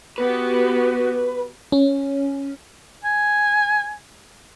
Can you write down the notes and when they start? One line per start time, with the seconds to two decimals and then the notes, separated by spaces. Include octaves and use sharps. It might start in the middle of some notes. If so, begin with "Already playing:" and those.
0.18 B3 F#4 G4 B4
1.72 C#4
3.04 G#5